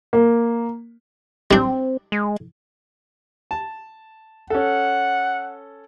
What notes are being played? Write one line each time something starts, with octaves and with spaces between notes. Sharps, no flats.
A#3
G3 C4 D4
G#3
A5
C#4 A4 F#5